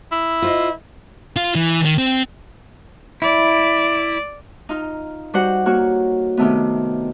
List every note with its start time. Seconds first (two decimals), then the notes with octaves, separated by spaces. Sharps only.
0.12 E4
0.42 F4 C5 D#5
1.36 F4
1.55 E3
1.85 D#3
1.98 C4
3.22 E4 D5
4.69 D#4 F4
5.34 G3 F#4 C5 F#5
5.66 A#3 F#4 C#5
6.37 C3 D#3 A3 B3